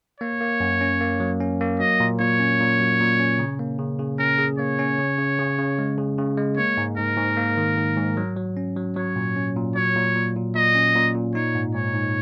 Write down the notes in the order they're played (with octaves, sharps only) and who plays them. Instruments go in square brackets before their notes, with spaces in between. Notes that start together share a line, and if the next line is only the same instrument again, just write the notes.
[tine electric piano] A#3 [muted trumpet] C#5
[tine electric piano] A#3
F#2
C#4
A#3
F#3
C#4
A#3
[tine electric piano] F#3 [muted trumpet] D#5
[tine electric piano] A#2
[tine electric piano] A#2 [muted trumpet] C#5
[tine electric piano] C#4
A#2
F#3
A#2
C#4
C#3
A#3
C#3
C#3
[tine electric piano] C#4 [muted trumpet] A#4
[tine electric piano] G#4
[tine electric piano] A#3 [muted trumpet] C#5
[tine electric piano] C#4
C#3
C#3
C#3
C#3
G#3
C#3
C#3
G#3
[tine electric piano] A#3 [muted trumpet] C#5
[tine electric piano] G#2
[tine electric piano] G#2 [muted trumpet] A#4
[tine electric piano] G#2
A#3
D#3
D#3
G#2
F#3
F#3
C#4
F#3
[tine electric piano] F#3 [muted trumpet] C#5
[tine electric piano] A#2
C#4
A#2
[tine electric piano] F#3 [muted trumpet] C#5
[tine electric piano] A#2
A#2
A#2
[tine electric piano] A#2 [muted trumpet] D#5
[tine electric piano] C#4
A#2
A#2
[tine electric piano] D#4 [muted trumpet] C#5
[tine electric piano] G#2
[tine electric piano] G#2 [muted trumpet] C#5
[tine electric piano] G#2